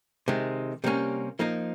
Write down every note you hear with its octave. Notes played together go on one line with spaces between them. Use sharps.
C3 D#3 G#3
C3 G3 A#3 C#4
F3 A#3 D#4